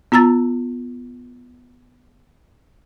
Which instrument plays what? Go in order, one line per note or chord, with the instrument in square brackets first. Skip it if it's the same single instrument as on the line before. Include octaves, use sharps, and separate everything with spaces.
[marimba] B3 F4 A#5 E6 A6